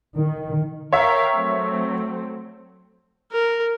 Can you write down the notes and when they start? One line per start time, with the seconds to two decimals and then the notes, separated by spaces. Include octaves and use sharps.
0.17 D#3
0.93 A#4 C#5 E5 F5 G5
1.34 F#3 A3 C4
3.32 A#4